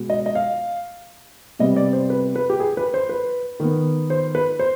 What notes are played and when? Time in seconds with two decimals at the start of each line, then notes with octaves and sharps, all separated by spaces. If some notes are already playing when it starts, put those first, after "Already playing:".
Already playing: B2 G#3 B3
0.10 D#5
0.26 D#5
0.35 F5
1.59 C3 G3 B3 D#5
1.76 D5
1.93 C5
2.10 B4
2.36 B4
2.50 G4
2.60 G#4
2.77 B4
2.94 C5
3.09 B4
3.60 D#3 B3
4.10 C5
4.35 B4
4.59 C5